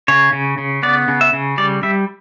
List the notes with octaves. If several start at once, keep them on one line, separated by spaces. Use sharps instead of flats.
C#3 C#5
C#3
C#3
B3 D5
C#3
E5
C#3
G3 D5
G3 E5